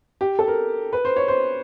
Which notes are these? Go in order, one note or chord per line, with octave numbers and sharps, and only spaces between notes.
G4
A4
A#4
B4
C5
C#5
C5